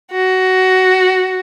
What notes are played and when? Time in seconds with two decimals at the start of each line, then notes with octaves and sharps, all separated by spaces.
0.11 F#4